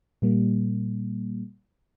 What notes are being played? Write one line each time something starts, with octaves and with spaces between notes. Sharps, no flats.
A#2 G3 A#3